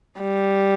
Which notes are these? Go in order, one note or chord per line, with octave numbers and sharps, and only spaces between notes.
G3